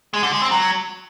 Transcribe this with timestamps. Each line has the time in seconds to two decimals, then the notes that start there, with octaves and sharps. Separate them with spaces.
0.14 G#3
0.23 D3
0.32 G#3
0.42 C4
0.51 F#3